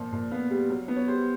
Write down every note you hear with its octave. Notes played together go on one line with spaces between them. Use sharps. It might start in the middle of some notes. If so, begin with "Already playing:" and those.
Already playing: A#2 F3
A#2
B3 F5
G3
F#3
B3
C#5
G3 C5